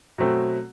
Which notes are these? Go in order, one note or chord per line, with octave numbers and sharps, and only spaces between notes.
B2 F#3 A3 C4